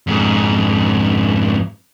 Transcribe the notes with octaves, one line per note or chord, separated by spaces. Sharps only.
F2 G#2